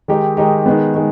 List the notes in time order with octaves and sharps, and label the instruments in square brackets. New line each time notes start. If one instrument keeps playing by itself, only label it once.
[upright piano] D#3 G#3 D#4 G4
D#3 G#3 D#4 G4
D#3 G#3 B3
D#3 G#3